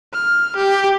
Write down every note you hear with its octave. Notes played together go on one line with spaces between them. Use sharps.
F6
G4